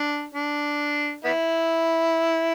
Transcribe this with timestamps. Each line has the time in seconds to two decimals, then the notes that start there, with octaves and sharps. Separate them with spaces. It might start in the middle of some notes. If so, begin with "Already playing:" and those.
Already playing: D4
0.34 D4
1.24 B3 E4